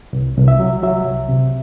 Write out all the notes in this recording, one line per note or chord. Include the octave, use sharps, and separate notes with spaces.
C2
C2
E5
F#3
F#3 E5
C2
C3